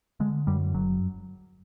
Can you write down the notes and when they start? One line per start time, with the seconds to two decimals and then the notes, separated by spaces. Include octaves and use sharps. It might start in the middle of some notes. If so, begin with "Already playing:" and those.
0.20 D3 G#3
0.47 F#2 G3
0.74 F#1 F#3